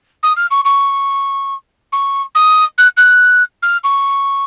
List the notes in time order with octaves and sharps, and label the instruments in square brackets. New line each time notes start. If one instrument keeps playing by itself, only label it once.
[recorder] D#6
F6
C#6
C#6
C#6
D#6
F#6
F#6
F6
C#6